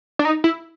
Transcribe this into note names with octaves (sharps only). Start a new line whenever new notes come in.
D4
D#4
E4